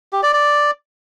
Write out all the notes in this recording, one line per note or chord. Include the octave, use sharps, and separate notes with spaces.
G4
D5
D5